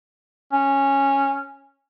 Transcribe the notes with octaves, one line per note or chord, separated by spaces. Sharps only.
C#4